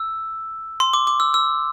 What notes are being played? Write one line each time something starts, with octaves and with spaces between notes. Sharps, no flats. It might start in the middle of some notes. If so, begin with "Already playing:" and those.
Already playing: E6
C6
D6
D6
E6
E6